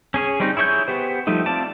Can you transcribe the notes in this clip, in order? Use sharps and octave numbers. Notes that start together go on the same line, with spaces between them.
C#4 G#4 C#5
G3 C4 C#4 D#4
E4 G#4 C#5 D#5 G6
B3 G4 C5
F3 G3 A3 D#4
C4 F4 D5 A5